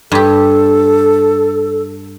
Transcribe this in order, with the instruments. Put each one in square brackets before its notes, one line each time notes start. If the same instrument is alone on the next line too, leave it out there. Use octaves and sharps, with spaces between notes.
[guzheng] G2 G4 [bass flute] A4